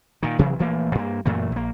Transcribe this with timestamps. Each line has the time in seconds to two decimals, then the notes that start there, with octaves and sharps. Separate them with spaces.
0.23 A#2 D#3
0.38 F#1 C3 E3 F#3
0.59 A#1 E3 A3 A#3
0.95 G2 A#3
1.26 F#2 A#2 E3 A3
1.52 A#1 A#3